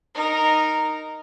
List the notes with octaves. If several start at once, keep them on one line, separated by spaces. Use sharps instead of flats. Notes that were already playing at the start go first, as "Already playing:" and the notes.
D#4 A#4